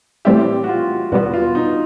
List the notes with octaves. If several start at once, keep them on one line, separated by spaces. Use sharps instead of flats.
A2 E3 G3 C4 E4 G4
F#4
F4
E2 B2 G3 B3 F#4
F4
D#4